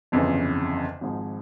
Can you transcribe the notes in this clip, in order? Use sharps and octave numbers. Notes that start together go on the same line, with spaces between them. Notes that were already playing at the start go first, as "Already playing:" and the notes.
G1 F2 C#3 E3
G#1 G#2 F3